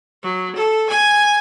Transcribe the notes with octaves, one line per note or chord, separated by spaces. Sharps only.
F#3
A4
G#5